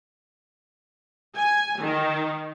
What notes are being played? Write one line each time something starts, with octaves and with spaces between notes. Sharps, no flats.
G#5
D#3